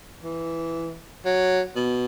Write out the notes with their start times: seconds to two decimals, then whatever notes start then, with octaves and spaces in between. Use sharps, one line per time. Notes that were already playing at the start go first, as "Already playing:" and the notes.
0.23 E3
1.25 F#3
1.76 B2